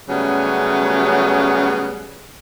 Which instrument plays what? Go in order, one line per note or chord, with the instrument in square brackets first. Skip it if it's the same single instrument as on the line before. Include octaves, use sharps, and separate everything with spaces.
[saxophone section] C#3 F#3 G3 A3 B3 C#4